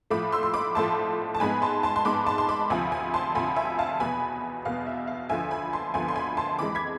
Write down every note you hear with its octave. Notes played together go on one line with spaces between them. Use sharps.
A2 F3 A3 B5 D6
C6 E6
C6
B5 D6
A2 F3 A3 A5 C6
A5
G#2 G#3 B3 G#5 B5
A5 C6
A5 C6
C6
G#2 G#3 B3 B5 D6
A5 C6
C6
B5 D6
D2 C3 F3 G#5 B5
G#5 B5
A5 C6
D2 C3 F3 G#5 B5
E5 G#5
F5 A5
E2 B2 B3 G#5 B5
E2 B2 B3 F5
E5
F5
D2 D3 F3 B3 E5 G#5
G#5 B5
A5 C6
D2 D3 F3 B3 G#5 B5
C6
G#5 B5
A5 C6
F2 E3 G#3 B5 D6
G#6 B6